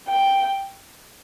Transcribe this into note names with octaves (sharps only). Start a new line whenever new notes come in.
G5